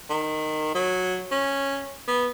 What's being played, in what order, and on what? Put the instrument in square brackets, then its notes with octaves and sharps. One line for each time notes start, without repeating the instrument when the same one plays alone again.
[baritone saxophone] D#3
F#3
C#4
B3